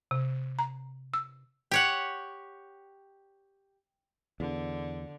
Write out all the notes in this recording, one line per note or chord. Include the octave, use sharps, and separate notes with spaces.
C3
A#5
E6
G4 C#5 F#5
E2 D3